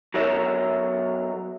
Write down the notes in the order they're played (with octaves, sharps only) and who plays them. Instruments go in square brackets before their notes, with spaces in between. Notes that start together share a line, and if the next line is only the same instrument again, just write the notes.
[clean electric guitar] F#3 B3 A4 A#4 C#5 E5